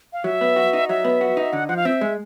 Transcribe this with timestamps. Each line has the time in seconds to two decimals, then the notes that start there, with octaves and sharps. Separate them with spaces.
0.13 F5
0.24 F#3 E5
0.41 B3
0.56 F#4
0.73 D#4
0.89 F#3 E5
1.04 B3
1.21 F#4
1.37 D#4
1.53 D3 F#5
1.68 F3 F#5
1.77 F5
1.85 C4 E5
2.01 G#3